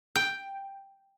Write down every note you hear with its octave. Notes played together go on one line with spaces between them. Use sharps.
G5